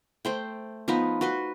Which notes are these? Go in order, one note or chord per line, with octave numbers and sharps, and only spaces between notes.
A3 C5 G5
F3 B3 D#4 B4
F#4 B4 C6